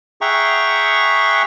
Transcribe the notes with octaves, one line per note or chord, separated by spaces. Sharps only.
G#4 E5 F#5 G5 A#5 C#6